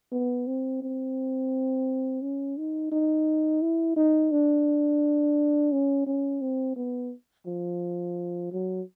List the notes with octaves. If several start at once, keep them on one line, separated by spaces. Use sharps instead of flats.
B3
C4
C4
C#4
D#4
D#4
E4
D#4
D4
C#4
C#4
C4
B3
F3
F#3